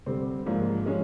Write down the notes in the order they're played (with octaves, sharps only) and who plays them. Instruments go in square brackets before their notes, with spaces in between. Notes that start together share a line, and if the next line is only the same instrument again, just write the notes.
[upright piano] D3 G3 C4
G#2 F3 A#3 D4
F3 G#3 C#4